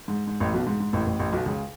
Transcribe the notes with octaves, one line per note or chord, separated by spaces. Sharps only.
G#2
G#2
A1 A2
B1 B2
G#2
G#2
A1 A2
A1 A2
A1 A2
B1 B2
C#2 C#3